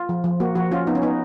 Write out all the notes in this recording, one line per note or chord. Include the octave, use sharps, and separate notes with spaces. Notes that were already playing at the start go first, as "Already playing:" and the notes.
Already playing: F4
F3
F3
A#3 F#4
F3 F#4
C#4 F4
B3 D#4
C#4
B3 D#4